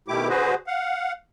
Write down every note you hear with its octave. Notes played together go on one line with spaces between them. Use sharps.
B2 D#3 A3 E4 G4 D6
D3 F#4 G#4 B4 C5
F5 F#5